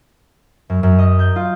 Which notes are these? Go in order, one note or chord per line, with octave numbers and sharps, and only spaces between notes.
F#2
F#2
D#5
G6
F4